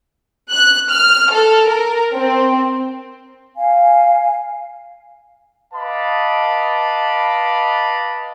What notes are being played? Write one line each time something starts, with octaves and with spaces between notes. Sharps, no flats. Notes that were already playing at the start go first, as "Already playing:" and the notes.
F#6
F6
A4
A#4
C4
F5 G#5
B4 D#5 F5 A5 B5 D6